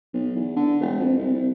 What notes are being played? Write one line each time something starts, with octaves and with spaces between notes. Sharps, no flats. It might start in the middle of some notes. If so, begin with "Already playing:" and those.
B1
E2
D3
E1
F2
C2
C2